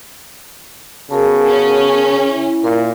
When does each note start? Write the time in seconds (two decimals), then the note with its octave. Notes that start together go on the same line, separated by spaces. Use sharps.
1.11 C#3 B3 F#4 G#4 A#4 A5
1.47 C#4
2.27 E4
2.64 A#2 A#4